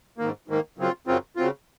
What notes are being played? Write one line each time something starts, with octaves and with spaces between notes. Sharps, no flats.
G#2 D#3 A#3
G#2 D#3 A#3
F#2 C#3 F#3 C4 F4
F#2 C#3 F#3 C4 F4
C#3 F#3 C4 F4